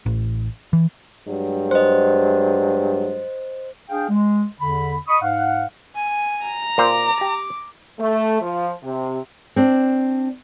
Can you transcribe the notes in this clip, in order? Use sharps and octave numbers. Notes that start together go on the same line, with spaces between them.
A1
E3
G2 F#3 G#3
C5 D#5
D4 G#4 F5 G5
G#3
E2 D3 B5
D#5 B5 C#6 D#6
G#2 F5 F#5
G#5
A#5
A#2 C5 D6
G4 A5
A3
F3
C3
C4 D4